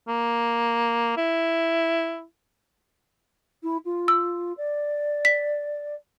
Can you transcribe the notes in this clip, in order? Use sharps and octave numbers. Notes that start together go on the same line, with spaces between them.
A#3
E4
E4
F4
E6
D5
B6